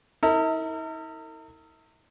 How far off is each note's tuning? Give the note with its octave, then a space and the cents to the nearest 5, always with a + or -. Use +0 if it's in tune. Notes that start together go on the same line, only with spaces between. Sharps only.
E4 -45 A#4 -40